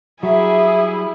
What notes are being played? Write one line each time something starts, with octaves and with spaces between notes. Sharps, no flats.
F#3 G3 E4 G#4 E5